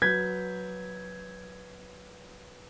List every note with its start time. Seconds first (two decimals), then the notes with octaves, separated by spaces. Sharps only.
0.02 F#3 B4 G6 G#6 B6